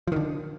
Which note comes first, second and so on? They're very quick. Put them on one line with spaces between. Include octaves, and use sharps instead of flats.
F3 D#3 D3